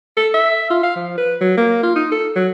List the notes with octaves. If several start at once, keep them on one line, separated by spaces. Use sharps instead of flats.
A4
E5
F4
F5
F3
B4
F#3
A#3
F4
D#4
A4
F#3